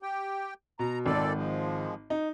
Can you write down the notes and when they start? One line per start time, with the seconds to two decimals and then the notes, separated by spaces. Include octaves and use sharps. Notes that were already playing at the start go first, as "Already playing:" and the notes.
0.02 G4 G5
0.79 B2 A#5
1.06 G#1 A#2 A4 D5
1.36 F3 G#3
2.10 D#4